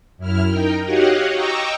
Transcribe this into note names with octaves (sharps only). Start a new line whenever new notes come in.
F#2 E4 F6
D#4 A#4 G5
F#4 G4 C#5 D#5 F5 F#5
D#5 G5 A#5 C#6 D6 E6